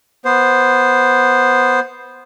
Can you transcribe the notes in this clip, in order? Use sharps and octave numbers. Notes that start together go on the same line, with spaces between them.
B3 C5